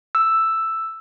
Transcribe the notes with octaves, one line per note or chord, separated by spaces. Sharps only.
E6